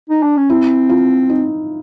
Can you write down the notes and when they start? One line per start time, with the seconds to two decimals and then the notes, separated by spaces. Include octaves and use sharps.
0.10 D#4
0.23 D4
0.37 C#4
0.50 C4 E4
0.89 F4
1.30 D#4